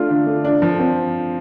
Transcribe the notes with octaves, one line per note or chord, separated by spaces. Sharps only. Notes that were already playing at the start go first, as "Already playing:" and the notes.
Already playing: A3 D4 F4
D3
A3
D4
F3
C4